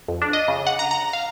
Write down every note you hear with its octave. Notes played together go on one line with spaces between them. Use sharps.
F2
D4
D#5
C#3
F#5
A#5
A#5
F5